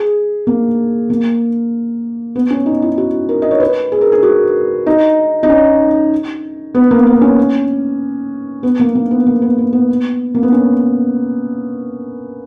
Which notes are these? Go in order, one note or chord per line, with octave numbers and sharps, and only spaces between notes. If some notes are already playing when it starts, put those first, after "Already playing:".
Already playing: G#4
A#3
A#3
B3
C#4
D#4
E4
F#4
A#4
D#5
C#5
B4
G#4
A#4
G#4
F#4
D#4
D#4
C#4
B3
A#3
B3
C#4
B3
A#3
A#3
B3
A#3
B3
B3
B3
A#3
B3
C#4